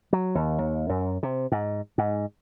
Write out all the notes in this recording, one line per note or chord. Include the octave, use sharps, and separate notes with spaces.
F#3
D#2
D#2
F#2
C3
G#2
G#2